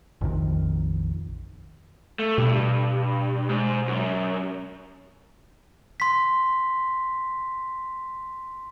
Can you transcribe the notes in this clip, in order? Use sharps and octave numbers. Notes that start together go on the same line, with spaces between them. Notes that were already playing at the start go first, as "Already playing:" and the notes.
A#1 F2 C3 D#3
A3
G2 B2
G#2
F#2
C6 B6